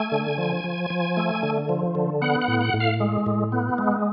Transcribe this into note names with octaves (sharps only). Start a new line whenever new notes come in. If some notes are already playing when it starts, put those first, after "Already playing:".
Already playing: A3 G#5
D3
F3
F3
F3
A3
D3
F3
D3
B3 F#5
F#5
A2
F#5
A2
F5
G#3
A2
B3
G#3